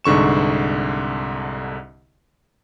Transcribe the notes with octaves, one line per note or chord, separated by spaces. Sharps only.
C2 G#2 D3 C#6 E7